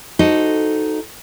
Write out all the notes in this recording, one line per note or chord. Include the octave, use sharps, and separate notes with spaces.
D#4 F#4 A4 C5 D#5